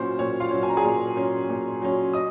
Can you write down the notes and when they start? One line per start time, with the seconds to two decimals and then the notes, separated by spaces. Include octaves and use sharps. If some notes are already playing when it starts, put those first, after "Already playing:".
Already playing: A#2 F#3 C#4 C5
0.19 A#2 C#5
0.40 F4 F5
0.51 F#3 C#4
0.63 G#5
0.69 A#5
0.77 G#4 G#5
0.84 A#2
1.16 F#3 C#4
1.49 A#2
1.82 F#3 C#4
2.13 D#5 D#6